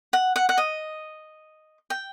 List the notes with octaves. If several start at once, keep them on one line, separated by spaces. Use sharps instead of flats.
F#5
F#5
F#5
D#5
G5